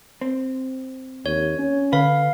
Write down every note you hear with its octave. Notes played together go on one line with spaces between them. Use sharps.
C4
D#2 C#5
C#4
D3 B4 F5